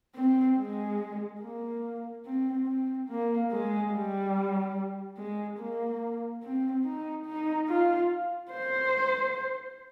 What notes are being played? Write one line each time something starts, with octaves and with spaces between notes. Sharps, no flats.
C4
G#3
A#3
C4
C4
A#3
G#3
G3
G#3
A#3
C4
D#4
D#4
F4
C5